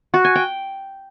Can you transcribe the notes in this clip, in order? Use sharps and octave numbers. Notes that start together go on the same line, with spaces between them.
F#4
G#5
G5